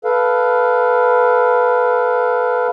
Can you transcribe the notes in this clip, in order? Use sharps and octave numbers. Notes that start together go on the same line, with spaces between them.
A4 B4 F5